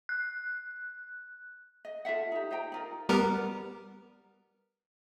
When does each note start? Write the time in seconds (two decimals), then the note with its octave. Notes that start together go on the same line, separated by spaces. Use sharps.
0.09 F#6
1.85 D#5
2.05 F4 A4 E5 F#5
2.32 D#4 G4
2.51 C5 D#5 G5 A#5
2.72 D#4 F4 A#4
3.09 G3 B3 A#4